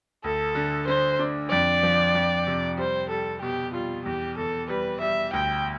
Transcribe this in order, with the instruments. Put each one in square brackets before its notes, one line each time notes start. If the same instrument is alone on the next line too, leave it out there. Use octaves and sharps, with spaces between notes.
[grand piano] D2 [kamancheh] A4
[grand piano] D3
[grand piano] D3 [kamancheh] C5
[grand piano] D4
[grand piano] F2 [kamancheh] D5
[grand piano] F3
F2
C3
[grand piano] G3 [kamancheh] C5
[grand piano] G3 [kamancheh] A4
[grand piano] B2 [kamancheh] G4
[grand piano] G3 [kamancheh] F4
[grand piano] E2 [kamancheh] G4
[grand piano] E2 [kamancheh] A4
[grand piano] G3 [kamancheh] B4
[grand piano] G3 [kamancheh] E5
[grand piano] D2 [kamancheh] G5